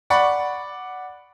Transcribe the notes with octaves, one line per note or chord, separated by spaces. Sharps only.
D5 F#5 B5 C#6